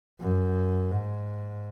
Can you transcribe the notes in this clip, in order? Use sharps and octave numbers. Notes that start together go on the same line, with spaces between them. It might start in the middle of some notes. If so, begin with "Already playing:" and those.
F#2
G#2